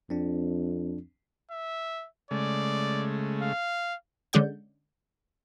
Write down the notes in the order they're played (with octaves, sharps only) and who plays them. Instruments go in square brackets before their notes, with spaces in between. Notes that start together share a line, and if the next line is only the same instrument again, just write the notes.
[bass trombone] F2 [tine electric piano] C4 D4
[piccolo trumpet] E5
[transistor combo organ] C#3 G#3 A3 [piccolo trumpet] D5
[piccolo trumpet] F5
[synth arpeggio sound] D3 G#3 C#4 D5 F#5 G6